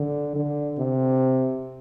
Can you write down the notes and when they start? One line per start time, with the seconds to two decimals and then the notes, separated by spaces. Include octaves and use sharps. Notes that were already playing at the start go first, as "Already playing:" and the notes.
Already playing: D3
0.35 D3
0.78 C3